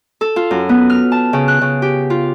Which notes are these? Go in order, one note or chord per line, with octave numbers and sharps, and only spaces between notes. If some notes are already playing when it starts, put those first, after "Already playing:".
A4
F4
F#2
B3
F6
A5
C#3
F#6
C#3
G4
F4